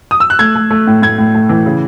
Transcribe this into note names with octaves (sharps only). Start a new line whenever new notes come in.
D#6
E6
F#6
A3 G#6
A3
A3
A2
A2 G#6
A2
A3
E3
C#3